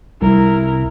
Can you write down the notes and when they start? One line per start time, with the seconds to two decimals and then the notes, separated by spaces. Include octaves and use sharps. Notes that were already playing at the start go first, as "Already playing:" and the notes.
0.22 C2 E4 A#4